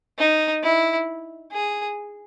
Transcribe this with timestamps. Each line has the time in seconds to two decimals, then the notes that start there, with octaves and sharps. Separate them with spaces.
0.18 D#4
0.63 E4
1.52 G#4